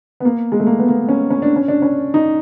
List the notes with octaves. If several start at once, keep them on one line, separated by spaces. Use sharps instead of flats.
B3
A#3
G#3
A3
A#3
B3
A#3
C#4
C#4
D4
C#4
D4
C#4
D#4